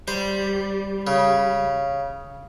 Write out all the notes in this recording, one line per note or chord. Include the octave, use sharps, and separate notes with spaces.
G3 C5
C#3